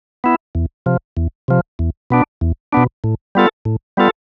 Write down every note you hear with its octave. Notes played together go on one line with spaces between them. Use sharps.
B3 E4
E2
C3 F3
E2
C3 F3
E2
B2 B3 D4
E2
B2 B3 D4
A2
G3 B3 F4 A4
A2
G3 B3 F4 A4